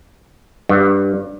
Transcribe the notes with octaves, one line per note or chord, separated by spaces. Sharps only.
G2